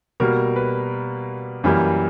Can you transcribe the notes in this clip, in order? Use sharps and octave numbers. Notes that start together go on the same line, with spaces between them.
B2 G3 A#3 A#4
B4
F#2 E3 G3 A#3